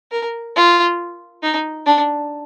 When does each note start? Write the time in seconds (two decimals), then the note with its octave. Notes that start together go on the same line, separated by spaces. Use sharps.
0.12 A#4
0.56 F4
1.43 D#4
1.86 D4